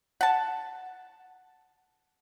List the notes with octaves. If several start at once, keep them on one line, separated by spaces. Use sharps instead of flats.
F#5 A5